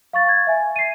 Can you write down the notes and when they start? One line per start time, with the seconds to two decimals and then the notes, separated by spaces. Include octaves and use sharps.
0.13 F5 C#6 A6
0.29 G#6
0.47 E5 G#5
0.76 C7 D#7